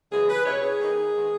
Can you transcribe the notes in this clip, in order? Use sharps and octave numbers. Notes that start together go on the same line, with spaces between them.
F#2 C#3 E3 G#3 B3 G#4
B4
B2 G#3 C#4 E4 C#5
G#4
D#3 A#3 D#4
D#3 G#3 B3